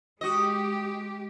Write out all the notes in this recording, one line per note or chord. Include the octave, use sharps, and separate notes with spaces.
G#3 F#4 G4 D#5